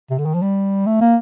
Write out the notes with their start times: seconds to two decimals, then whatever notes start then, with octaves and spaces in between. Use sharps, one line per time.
0.10 C3
0.18 D3
0.25 D#3
0.34 F3
0.42 G3
0.86 A3
1.01 A#3